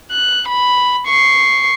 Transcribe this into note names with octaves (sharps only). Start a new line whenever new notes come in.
F#6
B5
C#6 C7